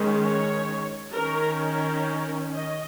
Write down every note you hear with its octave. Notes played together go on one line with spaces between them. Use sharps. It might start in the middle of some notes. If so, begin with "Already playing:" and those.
Already playing: D#3 G#3 C#4
C#5
D#3 C#4 A#4
A#4
D#5